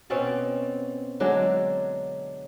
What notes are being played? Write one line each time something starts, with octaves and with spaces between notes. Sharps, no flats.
B2 C4 C#4 D5
D3 F#3 G#3 D4